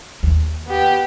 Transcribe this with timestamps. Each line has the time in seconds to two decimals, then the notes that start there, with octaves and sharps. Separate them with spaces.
0.23 D#2
0.67 B3 G4